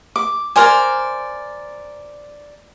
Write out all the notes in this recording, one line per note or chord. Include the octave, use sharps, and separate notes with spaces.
D6
A#4 C5 D5 G#5